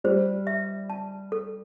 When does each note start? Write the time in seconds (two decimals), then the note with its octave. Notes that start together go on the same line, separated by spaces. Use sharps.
0.04 G3 C5
0.47 E5
0.90 A5
1.32 A4